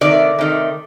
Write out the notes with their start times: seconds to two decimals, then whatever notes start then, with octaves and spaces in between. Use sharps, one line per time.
0.01 C3 D#3 A3 D5
0.39 C3 D#3 A3